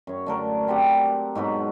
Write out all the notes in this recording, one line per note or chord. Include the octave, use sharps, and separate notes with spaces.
F#2 C#5
D3 A3 A#4
C4 G4 D5 F#5
G#2 B2 F#3 B5